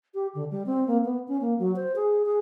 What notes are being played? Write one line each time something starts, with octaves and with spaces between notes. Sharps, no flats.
G4
D3
G3
C4
A#3
B3
C#4
A#3
F#3
C5
G#4
G#4